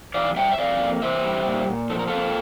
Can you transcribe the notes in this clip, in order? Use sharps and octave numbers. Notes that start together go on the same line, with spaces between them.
E3 D5 F5
G3 E5 G5
E5
F2 D5 F5
A#3
E3 C5 E5
G3
A#2
A#2
F3 A4
A#4
A#3 F4 A4